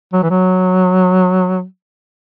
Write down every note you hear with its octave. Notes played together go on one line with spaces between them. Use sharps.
F#3
E3
F#3